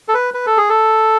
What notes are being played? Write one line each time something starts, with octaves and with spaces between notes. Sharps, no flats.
A4
B4
B4
A4
G#4
A4